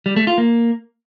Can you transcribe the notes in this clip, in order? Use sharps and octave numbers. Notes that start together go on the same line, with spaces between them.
G3
A3
F4
A#3